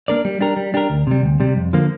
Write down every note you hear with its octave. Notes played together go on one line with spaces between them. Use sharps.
A#3 D4 A#4 D5
G3
D4 G4 A#4
G3
D4 G4 A#4
D2
C3 G3
D2
C3 G3
F2
D3 F3 A#3